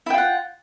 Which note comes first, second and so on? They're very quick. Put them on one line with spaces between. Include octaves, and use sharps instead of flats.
E4 G5 F4 F#5